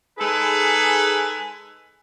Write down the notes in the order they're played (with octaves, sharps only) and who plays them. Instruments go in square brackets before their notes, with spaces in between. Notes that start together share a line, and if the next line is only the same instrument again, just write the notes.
[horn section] G#3 D#4 G#4 A4 B4